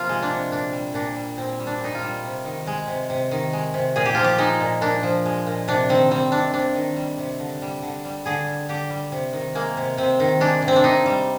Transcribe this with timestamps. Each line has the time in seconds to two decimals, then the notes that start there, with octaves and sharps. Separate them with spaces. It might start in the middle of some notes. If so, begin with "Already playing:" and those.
Already playing: C3 F3 A#3 F4
0.09 G#3
0.22 D4
0.30 C3
0.51 A#2 D4
0.73 G3
0.94 A#2 D4
1.16 G3
1.37 A#2 C4
1.59 G3
1.67 D4
1.80 A#2 D#4
1.95 F4
2.03 G3
2.24 C3
2.45 D#3
2.67 G#3
2.88 C3
3.10 C3
3.31 D#3
3.53 G#3
3.74 C3
3.96 A#2 G#4
4.06 G4
4.15 F3 F4
4.24 G4
4.38 G#3 D#4
4.60 A#2
4.81 A#2 D4
5.03 F3
5.25 G#3
5.47 A#2
5.68 C3 D4
5.89 D#3 C4
6.11 G3 C4
6.32 C3 D4
6.54 C3 D4
6.75 D#3
6.96 G3
7.18 C3
7.40 D3
7.62 G3
7.82 D3
8.05 G3
8.26 D3 G#4
8.47 G3
8.69 D3 G4
8.90 G3
9.12 C3
9.33 D#3
9.55 G#3 A#3
9.77 C3
9.98 C3 C4
10.20 D#3
10.40 G#3 D4
10.62 C3
10.68 C4
10.76 D4
10.84 C3 D#4
11.06 G3